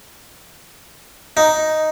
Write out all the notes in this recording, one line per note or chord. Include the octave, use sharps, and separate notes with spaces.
D#4